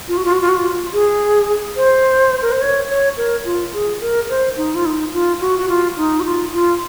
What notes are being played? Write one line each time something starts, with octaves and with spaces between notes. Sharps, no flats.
F4
F#4
F4
F#4
F4
F#4
F4
G#4
C5
A#4
C5
C#5
C#5
A#4
F4
G#4
A#4
C5
D#4
F4
D#4
F4
F#4
F#4
F4
D#4
F#4
F4
F4